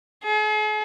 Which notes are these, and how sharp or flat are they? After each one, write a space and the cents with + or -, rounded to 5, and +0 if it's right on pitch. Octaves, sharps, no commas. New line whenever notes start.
G#4 +45